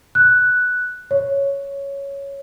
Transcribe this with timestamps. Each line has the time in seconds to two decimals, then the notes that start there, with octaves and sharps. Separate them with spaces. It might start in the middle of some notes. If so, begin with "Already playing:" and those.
0.15 F#6
1.11 C#5